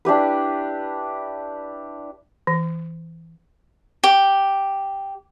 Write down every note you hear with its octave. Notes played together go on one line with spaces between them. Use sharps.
D4 E4 G4 B4
E3
G4